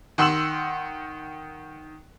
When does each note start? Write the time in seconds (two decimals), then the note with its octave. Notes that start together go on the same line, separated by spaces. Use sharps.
0.18 D#3 F#5 C6 E6 E7 F#7